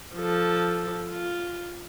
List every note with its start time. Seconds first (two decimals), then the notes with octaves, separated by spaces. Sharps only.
0.16 F3 A4
1.09 F4